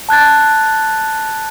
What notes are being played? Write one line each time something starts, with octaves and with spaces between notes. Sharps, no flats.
A5 F#6 G#6 A6